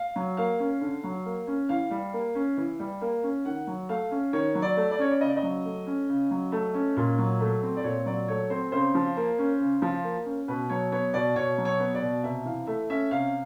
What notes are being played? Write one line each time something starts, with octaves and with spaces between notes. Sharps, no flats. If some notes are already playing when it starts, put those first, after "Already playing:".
Already playing: F5
F#3
A#3 F5
C#4
D3
F#3
A#3
C#4
E3 F5
G3
A#3
C#4
E3
G3
A#3
C#4
D#3 F#5
F#3
A3 F5
C#4
D#3 C#5
F#3
D5
A3
D5
C#4 C#5
D5
C#3 D#5
D5
D#5
F#3
A3
C#4
C#3
F#3
A3
C#4
A#2
F#3
A3
C4
D5
A#2 C#5
F#3 D5
A3 C#5
C4 C5
C#3 C5
F3
A#3
C#4
C#3
F3
A#3
C#4
B2 B4
F#3 C#5
B3 C#5
B2 D5
B2 C#5
F#3
C#5
B3
D5
B2
C3 E5
E3 F5
A3 E5
C#4 E5
C3 F5